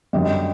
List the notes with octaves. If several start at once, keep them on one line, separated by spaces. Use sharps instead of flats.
F#2 D3 G3 D#5